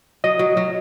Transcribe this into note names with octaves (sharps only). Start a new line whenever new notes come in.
F#3 D#5
F#3
F#3